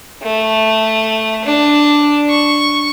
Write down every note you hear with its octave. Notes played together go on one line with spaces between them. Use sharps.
A3
D4
C#6